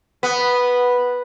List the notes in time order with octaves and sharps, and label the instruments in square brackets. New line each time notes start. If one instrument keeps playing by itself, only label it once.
[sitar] B3